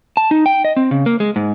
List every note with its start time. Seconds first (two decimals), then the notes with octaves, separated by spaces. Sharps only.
0.17 A5
0.31 D#4
0.46 G5
0.65 D#5
0.77 C4
0.91 C#3
1.06 A#3
1.20 G#3
1.36 G#2